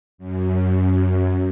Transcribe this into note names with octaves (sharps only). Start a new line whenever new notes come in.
F#2